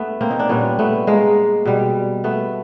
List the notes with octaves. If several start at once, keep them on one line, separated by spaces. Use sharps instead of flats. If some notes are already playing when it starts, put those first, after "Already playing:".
Already playing: G2 A3 B3
A#3 C4
D#4
D4
A#2 G3 B3 C#4
A3 B3
G#3 A#3
B2 G3
A3 B3